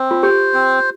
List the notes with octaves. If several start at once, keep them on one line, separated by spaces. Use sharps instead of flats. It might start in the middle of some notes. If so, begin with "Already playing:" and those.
Already playing: C4
F4
G4 C5
C4